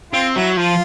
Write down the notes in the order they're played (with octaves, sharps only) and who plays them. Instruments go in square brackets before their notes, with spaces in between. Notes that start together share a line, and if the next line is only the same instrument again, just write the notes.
[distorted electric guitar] C4 [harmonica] F4
[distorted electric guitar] F#3 [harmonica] E4
[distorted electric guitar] F3 [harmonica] F4